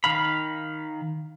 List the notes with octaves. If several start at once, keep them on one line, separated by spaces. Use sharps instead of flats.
D#3 F5 B5